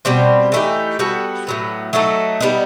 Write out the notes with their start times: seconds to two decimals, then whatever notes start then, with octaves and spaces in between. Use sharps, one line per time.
0.05 B2 G3 C4
0.52 E3 A3 D#4 G4
0.99 G3 B3 F#4 A4
1.47 A2 F#3 B3
1.93 F#3 A3 D#4 A4
2.41 G3 B3 D#4